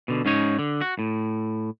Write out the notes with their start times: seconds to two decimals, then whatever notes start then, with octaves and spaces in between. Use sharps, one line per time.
0.08 B2 D3
0.25 G#2 C#4 D#4 C#5
0.59 D3
0.81 F#4
0.99 A2